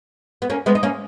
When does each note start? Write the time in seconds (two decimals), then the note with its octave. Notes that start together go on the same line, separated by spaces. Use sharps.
0.42 B3
0.50 A#3 C#4
0.66 G#3 B3
0.75 D#4
0.83 A#3 C#4